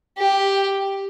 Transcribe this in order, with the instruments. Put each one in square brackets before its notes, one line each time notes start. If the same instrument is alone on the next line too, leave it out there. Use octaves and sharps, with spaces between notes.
[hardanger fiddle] G4